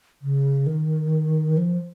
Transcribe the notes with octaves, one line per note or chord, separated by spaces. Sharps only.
C#3
D#3
F3